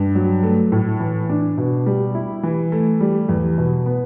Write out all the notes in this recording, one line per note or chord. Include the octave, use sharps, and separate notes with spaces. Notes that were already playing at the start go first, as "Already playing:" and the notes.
Already playing: G2
F#3
A3
A2
E3
D4
B2
G3
E4
E3
A3
G3
E2
B2
B3